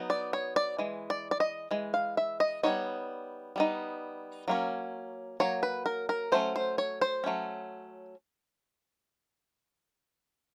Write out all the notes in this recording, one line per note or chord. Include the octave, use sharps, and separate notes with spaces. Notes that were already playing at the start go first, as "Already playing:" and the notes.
Already playing: F#3 B3 D#4
D5
C#5
D5
E3 G#3
D5
D5
D#5
E3 G#3
F5
E5
D#5
G3 B3 D#4 C#5
G3 B3 D#4
F#3 A#3 C#4
F#3 A#3 C#5
B4
A#4
A#4
F#3 A3 C#4 C5
C5
C#5
C5
F#3 A3 C#4